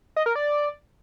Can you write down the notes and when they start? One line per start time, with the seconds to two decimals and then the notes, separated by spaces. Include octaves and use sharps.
0.16 D#5
0.26 A#4
0.35 D5